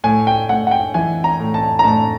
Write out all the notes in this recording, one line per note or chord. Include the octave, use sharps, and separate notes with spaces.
A2 G#5
G5
A2 F#5
F#5
G5
E3 G#5
A#5
A2
A5
A#5
A2 A5